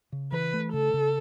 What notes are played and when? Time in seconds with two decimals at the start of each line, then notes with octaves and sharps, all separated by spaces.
0.12 C#3
0.32 E3 B4
0.53 A3
0.73 C#3 A4
0.94 C#3